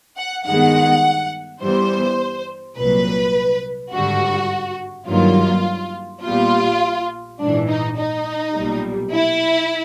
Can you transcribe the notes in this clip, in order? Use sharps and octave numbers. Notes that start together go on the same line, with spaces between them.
F#5
G2 D#3 G#3 B3 F#5
G2 E3 G3 B3 C5
C2 A#2 F#3 B4
G#1 G2 D3 G3 F#4
G2 D#3 F#3 A#3 F4
A#1 A#2 G3 B3 F4
A#1 G#2 E3 D4
D#4
D#4
B1 A#2 G3
E4